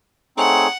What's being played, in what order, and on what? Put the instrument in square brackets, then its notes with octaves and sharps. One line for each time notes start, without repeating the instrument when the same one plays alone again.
[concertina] A3 C4 D#4 G#4 C#5 [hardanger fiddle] F#5